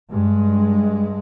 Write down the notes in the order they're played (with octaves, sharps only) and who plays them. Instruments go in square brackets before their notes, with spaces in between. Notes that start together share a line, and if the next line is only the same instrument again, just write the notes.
[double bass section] G2 G#3